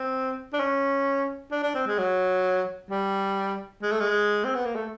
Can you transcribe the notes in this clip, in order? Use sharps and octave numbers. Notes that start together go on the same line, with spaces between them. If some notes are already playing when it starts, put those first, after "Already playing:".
Already playing: C4
D4
C#4
D4
D4
C4
G#3
F#3
G3
G#3
A3
G#3
C4
B3
A#3
A3